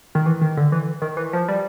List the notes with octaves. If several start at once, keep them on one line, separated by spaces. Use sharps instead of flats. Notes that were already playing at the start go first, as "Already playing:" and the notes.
D#3
E3
D#3
D3
E3
D#3
E3
F3
G3